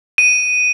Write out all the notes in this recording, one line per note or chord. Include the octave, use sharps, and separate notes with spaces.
D#7